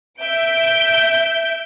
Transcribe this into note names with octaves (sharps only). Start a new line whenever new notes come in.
E5 G6 D7